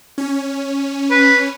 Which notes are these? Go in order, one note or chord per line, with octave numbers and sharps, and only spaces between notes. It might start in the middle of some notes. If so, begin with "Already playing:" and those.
C#4
B4